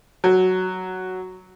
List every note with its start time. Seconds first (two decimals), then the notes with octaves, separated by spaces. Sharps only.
0.24 F#3